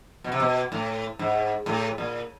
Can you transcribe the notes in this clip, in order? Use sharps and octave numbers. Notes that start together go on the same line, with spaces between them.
B2
C3
B2
A2
G#2
A2
A#2